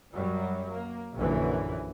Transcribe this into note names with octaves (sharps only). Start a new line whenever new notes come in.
F#2 F#3 G3
A#3
A#1 F#2 D3 E3